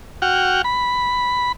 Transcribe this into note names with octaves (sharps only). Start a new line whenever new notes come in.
F#4 F#5 G5 F6
B5